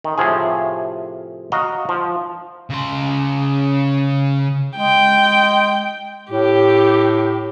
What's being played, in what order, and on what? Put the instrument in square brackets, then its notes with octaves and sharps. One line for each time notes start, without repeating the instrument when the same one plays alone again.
[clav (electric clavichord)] D#3
A2 C3 F3 G#4
F#4 D#5 F5 A#5
F3
[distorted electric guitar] C#3 C6
[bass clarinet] G#3 [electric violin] G5
[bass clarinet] A2 [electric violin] G4